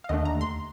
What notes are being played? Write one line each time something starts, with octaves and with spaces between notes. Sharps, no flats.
F5
D#2 D3 A3 D4 D#5
A#5
C6